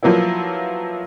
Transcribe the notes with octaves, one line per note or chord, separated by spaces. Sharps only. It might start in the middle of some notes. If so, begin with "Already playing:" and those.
F3 F#3 A#3 B3 E4